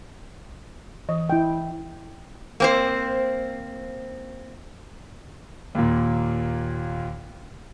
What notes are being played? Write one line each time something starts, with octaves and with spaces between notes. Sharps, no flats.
E3 D#5
E4 D#5 G5
A#3 C4 C5
D#2 A#2